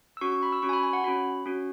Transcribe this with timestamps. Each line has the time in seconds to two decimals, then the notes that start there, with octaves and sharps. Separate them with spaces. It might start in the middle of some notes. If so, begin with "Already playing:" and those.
0.17 E6
0.21 C#4 F#4 C#6
0.32 C#6
0.43 B5
0.52 E6
0.62 C#4 F#4 C#6
0.69 G#5
0.73 B5
0.83 G#5
0.93 F#5
1.04 C#4 F#4 B5
1.46 C#4 F#4